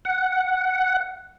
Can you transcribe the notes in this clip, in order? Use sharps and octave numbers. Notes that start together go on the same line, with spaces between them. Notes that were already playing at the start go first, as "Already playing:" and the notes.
F#5